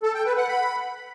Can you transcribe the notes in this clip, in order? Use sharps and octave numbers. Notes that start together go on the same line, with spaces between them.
A4
G5
B4
F#5
B5